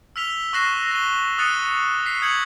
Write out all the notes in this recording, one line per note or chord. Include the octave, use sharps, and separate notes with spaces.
E6 F6 B6 F7 G7
C#6 E6 F#6 A#6 C7 E7
A#6 D#7 G7
D#6 F#6 A6 C#7 D#7
B6 C7
D#6 G6 G#6 C7 C#7 F#7